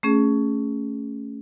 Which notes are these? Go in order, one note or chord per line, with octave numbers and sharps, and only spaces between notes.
A3 C#4 G#4